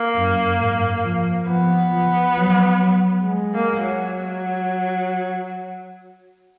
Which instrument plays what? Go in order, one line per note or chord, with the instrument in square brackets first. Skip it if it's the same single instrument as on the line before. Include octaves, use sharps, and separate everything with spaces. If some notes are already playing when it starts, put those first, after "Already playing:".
Already playing: [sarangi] A#3
[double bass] F#2
G#2
F3
[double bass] F3 [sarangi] B3
[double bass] F3
F#3
F#3
G#3
[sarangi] A#3
F#3